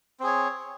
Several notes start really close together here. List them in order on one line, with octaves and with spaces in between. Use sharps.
C4 G#4 C#5